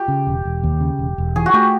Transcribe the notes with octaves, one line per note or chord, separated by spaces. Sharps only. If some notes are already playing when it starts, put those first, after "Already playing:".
Already playing: G4
C#3
E1
E1
D#2
C#3
E1
E1
E3 G#4
F#4
A3 G4